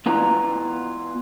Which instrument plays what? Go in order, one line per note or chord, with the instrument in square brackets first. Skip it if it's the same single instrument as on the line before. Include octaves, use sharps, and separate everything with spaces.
[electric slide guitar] B3 E4 F4 B4 A#5